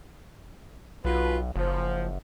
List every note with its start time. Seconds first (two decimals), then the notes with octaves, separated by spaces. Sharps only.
1.05 B1 F4 F#4 B4
1.56 F#1 F3